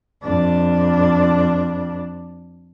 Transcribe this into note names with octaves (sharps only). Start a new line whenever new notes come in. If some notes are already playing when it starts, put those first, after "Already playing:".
F2 D4